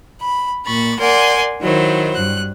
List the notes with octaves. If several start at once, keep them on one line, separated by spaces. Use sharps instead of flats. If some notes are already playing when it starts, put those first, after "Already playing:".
B5
A#2 B5 C#6 A6
A#4 D5 F#5 G#5 C6
D#3 F#3 E4 C5
G2 F#6